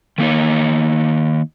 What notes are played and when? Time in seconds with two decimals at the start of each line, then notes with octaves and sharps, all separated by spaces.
0.18 D#3 A#3 D#4 C#5